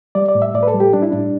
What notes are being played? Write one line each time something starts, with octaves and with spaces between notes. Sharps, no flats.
G3 D5
D5
A2
E5
A2 D5
B4
A4
G3
G4
G3 D4
E4
A2 D4